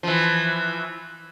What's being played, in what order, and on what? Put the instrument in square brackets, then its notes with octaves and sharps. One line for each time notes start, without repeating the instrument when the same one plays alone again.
[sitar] E3 F3